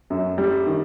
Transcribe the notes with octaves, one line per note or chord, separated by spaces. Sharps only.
F#2
G3
D#3